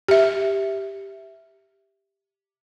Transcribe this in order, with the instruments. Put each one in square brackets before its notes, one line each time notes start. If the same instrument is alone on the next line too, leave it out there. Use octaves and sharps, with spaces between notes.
[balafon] G4 E5